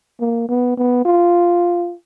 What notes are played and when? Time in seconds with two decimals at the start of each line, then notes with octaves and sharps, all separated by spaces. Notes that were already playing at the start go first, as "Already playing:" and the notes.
0.21 A#3
0.49 B3
0.78 B3
1.05 F4